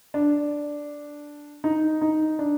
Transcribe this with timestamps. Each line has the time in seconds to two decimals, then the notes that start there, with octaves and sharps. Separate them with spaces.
0.14 D4
1.64 D#4
2.02 D#4
2.39 D4